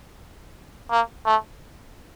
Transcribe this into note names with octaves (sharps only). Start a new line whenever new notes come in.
A#3
A3